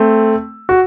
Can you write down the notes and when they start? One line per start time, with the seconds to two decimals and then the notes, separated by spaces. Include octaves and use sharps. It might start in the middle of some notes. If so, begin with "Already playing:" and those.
Already playing: A3 C4
0.69 F#4